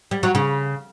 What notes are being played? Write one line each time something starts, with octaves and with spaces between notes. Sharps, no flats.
G3
F#3
C#3